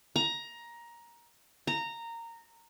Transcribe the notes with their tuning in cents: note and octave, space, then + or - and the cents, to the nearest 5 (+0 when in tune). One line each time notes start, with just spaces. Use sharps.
A#5 +15
A#5 -15